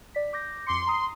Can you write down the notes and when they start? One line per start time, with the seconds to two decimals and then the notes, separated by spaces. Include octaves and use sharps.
0.15 D5 B6
0.33 D6 G6 A#6
0.66 F2 C6 D6 C#7
0.87 A#5 D#6